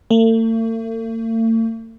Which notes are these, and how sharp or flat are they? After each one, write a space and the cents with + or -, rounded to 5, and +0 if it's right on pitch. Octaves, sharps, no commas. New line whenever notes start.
A3 +45